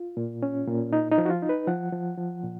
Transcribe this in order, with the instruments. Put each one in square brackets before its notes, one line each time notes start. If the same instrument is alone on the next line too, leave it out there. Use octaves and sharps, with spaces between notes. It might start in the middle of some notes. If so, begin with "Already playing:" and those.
Already playing: [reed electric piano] F4
A#2
C#4
A#2
D#4
D#4
F3
F#4
F4
D#4
B4
F3 F#5
F3
F3
A#2